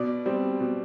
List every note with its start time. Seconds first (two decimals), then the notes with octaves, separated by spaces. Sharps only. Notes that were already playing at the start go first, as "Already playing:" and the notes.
Already playing: B2 D5
0.26 G3 C4
0.60 B2